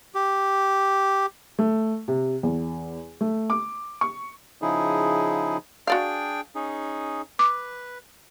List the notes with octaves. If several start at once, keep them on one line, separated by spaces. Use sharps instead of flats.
G4
A3
C3
E2
A3
D6
C#6
C#3 F3 D#4 E4 G#4
D4 F#4 G#4 D5 F5 G5
C#4 D#4 G#4
B4 D6